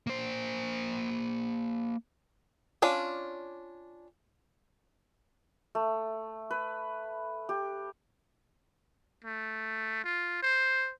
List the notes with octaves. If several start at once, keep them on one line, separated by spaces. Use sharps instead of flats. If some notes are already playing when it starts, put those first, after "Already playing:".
A#3 C5
C#4 D4 F4 D5
A3
B4
G4
A3
F4
C5